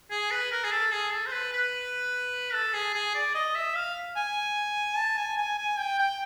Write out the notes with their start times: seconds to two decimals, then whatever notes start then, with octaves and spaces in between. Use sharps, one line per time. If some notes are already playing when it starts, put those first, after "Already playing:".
0.10 G#4
0.31 B4
0.52 A#4
0.64 G#4
0.71 A4
0.92 G#4
1.12 A4
1.27 C5
1.32 B4
1.53 B4
2.54 A4
2.74 G#4
2.94 G#4
3.15 D5
3.35 D#5
3.55 E5
3.75 F5
4.16 G#5
4.97 A5
5.17 G#5
5.37 G#5
5.58 G#5
5.78 G5
5.99 G5